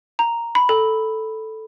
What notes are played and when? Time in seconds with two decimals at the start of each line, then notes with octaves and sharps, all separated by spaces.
0.19 A#5
0.55 B5
0.69 A4